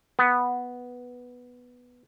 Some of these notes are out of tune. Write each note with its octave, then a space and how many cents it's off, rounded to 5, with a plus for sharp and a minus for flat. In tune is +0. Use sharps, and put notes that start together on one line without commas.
B3 -5